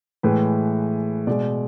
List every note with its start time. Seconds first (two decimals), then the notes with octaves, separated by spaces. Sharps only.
0.23 A2 E3 G#3 B4
1.27 B2 G#3 D5